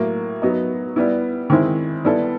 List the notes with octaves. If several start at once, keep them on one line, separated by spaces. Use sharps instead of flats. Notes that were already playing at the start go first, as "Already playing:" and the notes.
Already playing: A2 F#3 A#3
F#3 B3 D#4
G3 B3 E4
D#3 G#3 C4 E4
G3 B3 E4 A4